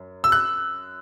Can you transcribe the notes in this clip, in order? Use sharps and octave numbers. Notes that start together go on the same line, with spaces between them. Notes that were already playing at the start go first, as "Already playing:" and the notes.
Already playing: F#2
E6
F#6